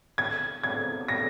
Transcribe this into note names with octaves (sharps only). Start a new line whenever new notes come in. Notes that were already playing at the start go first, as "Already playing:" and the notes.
G#6
G#6
A#6